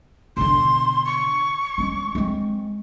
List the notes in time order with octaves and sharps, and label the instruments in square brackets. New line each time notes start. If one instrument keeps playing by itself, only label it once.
[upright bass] B2 D3 [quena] C6
[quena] C#6
[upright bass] G#3 C#4
G#3 C4